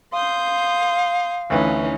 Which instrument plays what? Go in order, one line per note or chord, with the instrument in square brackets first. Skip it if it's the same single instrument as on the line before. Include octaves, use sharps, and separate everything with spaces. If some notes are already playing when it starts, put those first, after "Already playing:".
[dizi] F5 [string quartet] C6 D#6 G6
[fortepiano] D2 B4 [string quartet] E3 C#4 D#4